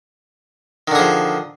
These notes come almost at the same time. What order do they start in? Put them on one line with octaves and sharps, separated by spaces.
D#3 D3 G#4 F3